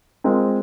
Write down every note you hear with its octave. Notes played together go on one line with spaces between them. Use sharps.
G#3 C4 F4 A#4